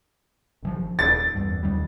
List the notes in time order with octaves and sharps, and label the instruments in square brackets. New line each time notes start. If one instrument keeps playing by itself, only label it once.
[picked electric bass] G#1 E3 F3
[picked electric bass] D#1 [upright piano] A6
[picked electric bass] E2 G2
D#2 D#3 G3